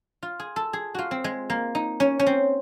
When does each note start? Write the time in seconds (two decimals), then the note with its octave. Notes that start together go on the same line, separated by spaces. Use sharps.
0.23 F4
0.40 G#4
0.56 A4
0.73 G#4
0.95 F4 F#4
1.11 C4
1.24 G#3
1.50 A#3
1.75 D#4
2.00 C#4
2.19 C#4
2.26 C4